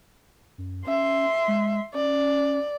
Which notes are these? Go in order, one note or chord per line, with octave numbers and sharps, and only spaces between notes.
F#2
C#4 E5 C6
G#3
C#4 D5